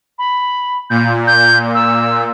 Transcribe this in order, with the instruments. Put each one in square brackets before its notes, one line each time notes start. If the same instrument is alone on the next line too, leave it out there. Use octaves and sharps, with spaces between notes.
[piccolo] B5
[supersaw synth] A#2 [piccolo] G6
[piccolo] G6
E6